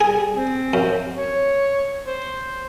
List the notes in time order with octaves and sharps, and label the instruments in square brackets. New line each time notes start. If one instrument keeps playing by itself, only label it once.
[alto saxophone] G3 [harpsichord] G#4
[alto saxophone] C4
[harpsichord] F#2
[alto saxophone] C#5
C5